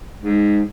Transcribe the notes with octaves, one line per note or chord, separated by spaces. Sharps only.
G#2